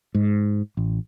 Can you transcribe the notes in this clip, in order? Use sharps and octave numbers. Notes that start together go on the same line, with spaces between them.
G#2
A1